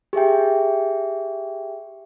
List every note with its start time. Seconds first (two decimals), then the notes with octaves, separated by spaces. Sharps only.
0.13 G4 G#4 E5 G5